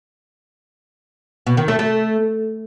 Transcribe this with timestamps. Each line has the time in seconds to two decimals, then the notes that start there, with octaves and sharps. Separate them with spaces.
1.47 B2
1.57 D#3
1.68 A3
1.79 A3